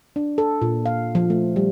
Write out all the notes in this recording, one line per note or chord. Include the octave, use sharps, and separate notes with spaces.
D4
A4
A#2
F5
F3
A3
G3